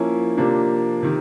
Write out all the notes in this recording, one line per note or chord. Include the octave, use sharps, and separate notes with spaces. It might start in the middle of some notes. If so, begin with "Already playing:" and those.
Already playing: F3 A#3 C#4 E4
C3 F3 A#3 D4
C3 D#3